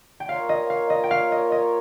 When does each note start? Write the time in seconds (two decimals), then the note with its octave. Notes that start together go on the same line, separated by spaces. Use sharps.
0.20 G5
0.28 A#3 F4 A#4 C#5 F5
0.49 D#5
0.70 F5
0.90 D#5
1.03 G5
1.11 F5
1.32 D#5
1.52 D#5